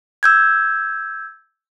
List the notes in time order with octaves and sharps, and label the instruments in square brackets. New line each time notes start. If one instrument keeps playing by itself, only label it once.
[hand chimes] E6 G6 G#6